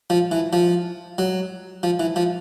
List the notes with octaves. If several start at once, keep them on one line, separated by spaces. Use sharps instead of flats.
F3
E3
F3
F#3
F3
E3
F3